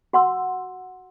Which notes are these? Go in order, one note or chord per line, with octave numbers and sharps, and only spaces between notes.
F#4 F#5 C6 E6